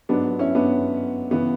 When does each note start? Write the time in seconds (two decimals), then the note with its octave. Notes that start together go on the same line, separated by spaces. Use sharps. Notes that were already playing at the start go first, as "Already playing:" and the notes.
0.09 G#2 F#3 B3 D4
0.39 C#4 E4
0.55 B3 D4
1.31 C#3 E3 B3